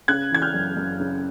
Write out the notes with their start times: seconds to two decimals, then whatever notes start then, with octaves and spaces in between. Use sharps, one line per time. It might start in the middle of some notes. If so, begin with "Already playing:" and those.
0.08 C#3 F#6 G#6
0.31 E3 G#6
0.42 F6 G6
0.54 F#2
0.77 F#2
1.00 C#3